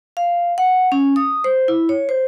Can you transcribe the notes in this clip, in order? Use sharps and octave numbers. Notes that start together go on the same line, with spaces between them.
F5
F#5
C#4
D#6
C5
E4
C#5
C5